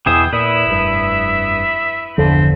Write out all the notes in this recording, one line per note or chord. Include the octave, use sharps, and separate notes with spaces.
E2 B2 E3 G#4 E5 G5 D#6
A#2 E4 B4 E5
F1 G2
G1 E2 D3 F3 C4